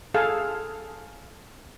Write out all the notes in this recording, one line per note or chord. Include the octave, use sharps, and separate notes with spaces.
G#4 A4 F5